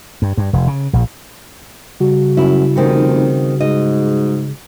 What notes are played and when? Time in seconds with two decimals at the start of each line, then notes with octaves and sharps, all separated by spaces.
0.22 G2
0.38 G2
0.53 F1
0.67 C#3
0.93 A#1
2.00 C#3 G3 F#4
2.37 F#2 E4
2.76 F1 D#3 C4 C#4
3.60 G#2 D#5